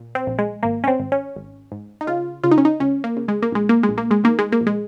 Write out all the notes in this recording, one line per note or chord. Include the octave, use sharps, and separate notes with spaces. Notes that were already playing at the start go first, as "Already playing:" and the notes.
Already playing: A#2
C4
A#1
G#3
G#1 A#3
C#4
C4
G#1
C#4
G#1
G#2
D#4
C#3 F4
C#3 F4
D#4
C#4
D#4
C#2 C#4
A#3
C#3
G#3
A#3
A#1 G#3
A#3
G#3
A#1
A#3
G#3
D#3 A#3
G#3
A#3
A#1
G#3